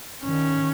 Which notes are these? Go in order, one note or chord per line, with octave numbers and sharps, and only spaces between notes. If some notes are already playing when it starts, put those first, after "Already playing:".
D#3 C#4